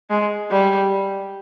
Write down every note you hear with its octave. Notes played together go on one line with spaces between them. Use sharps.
G#3
G3